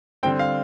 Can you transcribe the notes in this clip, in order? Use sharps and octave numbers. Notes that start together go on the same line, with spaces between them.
D3 G3 C4 G5
F5